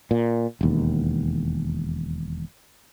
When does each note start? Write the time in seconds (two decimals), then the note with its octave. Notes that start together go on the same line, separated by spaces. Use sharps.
0.11 A#2
0.61 E1 D#2